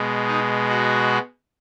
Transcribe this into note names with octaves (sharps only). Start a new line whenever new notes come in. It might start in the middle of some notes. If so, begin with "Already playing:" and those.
Already playing: B2 G#3
D#4
F#4